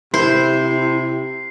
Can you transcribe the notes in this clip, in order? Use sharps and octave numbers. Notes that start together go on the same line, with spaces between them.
C3 E4 C5 C7